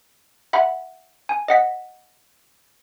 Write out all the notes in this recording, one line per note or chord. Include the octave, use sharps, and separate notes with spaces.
E5 F#5 B5
G#5
D#5 F#5 B6